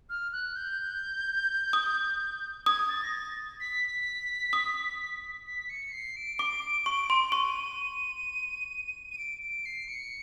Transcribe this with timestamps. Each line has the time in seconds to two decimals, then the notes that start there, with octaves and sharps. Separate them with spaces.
0.10 F6
0.33 F#6
0.56 G6
1.73 D#6
2.66 D#6 G#6
2.89 A6
3.04 A#6
3.12 A6
3.60 B6
4.53 D#6
5.47 B6
5.70 C#7
5.92 C7
6.16 D7
6.39 D6 D7
6.86 C#6
7.10 C6
7.32 C#6 D#7
9.12 D#7
9.18 D7
9.42 D7
9.66 C7
9.89 C#7